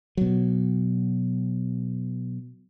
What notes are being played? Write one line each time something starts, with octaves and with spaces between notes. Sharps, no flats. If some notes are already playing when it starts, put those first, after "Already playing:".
B2 F#3